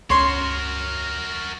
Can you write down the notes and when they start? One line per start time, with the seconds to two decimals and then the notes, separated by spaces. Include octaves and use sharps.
0.10 C#2 C#4 F#4 A#4 C#5 C6